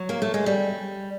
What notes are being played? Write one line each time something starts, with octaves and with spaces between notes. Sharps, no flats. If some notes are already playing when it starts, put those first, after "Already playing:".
Already playing: F#3
A#3
A3
G#3
G3